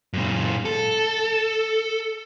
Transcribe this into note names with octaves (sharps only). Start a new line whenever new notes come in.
F#2 A#2
A4